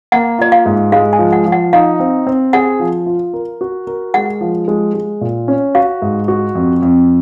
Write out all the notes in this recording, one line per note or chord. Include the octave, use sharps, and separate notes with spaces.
A#3 F#5
F4 D#5
F5
G#2
G#3 F5
G#5
F3
F#5
F3
F#5
D#4 F5
C4
C4
G#4 F#5
F3
F4
A#4
F#4
A#4
G#3 F#5
F3
G#3
G#3
A#2
C#4
F#4 F5
G#2
F#4
F2
F2